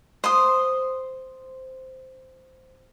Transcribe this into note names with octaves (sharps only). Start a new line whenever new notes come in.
C5 C6 D#6